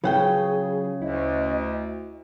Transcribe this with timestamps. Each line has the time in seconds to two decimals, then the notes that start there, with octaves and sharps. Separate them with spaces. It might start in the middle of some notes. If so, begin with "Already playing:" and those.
0.04 C#3 F#3 F4 G#4 B4 F#5 G5
1.02 D2 E4 D#5